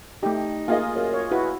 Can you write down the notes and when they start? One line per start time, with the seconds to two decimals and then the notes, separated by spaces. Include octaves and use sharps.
0.23 A3 D#4 G4
0.68 A#3 F4 G#4 D#5
0.95 F#2
1.13 C#5
1.31 E4 F#4 B4